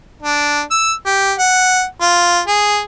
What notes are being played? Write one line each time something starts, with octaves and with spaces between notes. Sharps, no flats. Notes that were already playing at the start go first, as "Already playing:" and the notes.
D4
E6
G4
F#5
F4
G#4